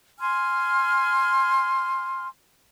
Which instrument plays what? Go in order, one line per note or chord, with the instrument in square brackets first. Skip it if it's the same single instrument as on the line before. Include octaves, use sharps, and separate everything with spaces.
[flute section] G#5 C6 F6